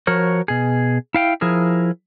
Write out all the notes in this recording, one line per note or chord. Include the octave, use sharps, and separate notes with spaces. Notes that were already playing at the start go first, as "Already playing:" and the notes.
F3 F#4 A#4 C#5
B2 G#4
E4 F5 G5
F3 E4 G#4 A#4